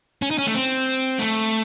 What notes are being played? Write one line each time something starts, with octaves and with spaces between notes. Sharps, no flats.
C#4
D#4
C#4
A3
C4
A3